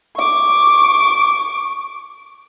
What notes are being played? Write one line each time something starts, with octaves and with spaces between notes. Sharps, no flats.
C#6 D6